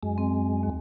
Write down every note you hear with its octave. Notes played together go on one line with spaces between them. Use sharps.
F#2 G#3
C4
D#2